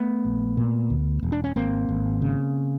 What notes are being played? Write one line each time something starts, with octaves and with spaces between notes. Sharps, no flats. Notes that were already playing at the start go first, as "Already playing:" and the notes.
Already playing: A3 B3
A#1
A#2
D2
E1
D4
C#4
G#1 A#3 C4
G#1
C#3